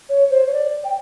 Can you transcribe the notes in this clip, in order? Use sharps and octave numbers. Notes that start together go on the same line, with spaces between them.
C#5
C5
C#5
D5
G5